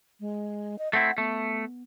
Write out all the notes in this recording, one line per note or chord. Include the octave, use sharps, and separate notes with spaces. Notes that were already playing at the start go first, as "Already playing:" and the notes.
G#3
D#5
A3 C4 E4 F#5
A3 B3